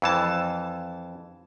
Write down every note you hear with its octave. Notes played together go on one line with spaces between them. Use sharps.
F2 E3 A5